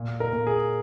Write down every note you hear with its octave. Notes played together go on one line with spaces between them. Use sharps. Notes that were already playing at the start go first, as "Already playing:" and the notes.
Already playing: A#2
A#4
A#2
G#4